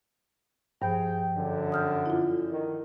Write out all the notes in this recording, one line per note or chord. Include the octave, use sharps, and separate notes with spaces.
G2 F3 G#4 C5 G5
F#2 D3
D#6 F6 G6
E4 F4
D#3